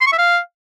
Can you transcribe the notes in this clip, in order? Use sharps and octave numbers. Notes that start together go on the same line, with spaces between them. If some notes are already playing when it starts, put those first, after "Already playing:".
C6
C#6
E5
F5